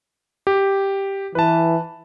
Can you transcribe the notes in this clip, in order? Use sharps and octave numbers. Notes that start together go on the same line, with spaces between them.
G4
E3 B4 A5